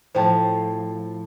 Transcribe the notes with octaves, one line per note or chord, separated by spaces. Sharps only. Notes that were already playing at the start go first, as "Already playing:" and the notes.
A2 F3 C5 G5 A5